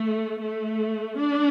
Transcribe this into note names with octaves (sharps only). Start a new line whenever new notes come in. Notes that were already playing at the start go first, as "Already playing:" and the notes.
Already playing: A3
A3
D4